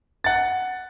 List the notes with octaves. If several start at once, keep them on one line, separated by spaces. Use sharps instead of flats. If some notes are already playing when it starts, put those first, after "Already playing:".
F#5 A6